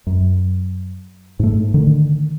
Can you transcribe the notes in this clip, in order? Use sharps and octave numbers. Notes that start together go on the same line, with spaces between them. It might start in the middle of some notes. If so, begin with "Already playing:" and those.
F#2
G#2 A3
D3 D#3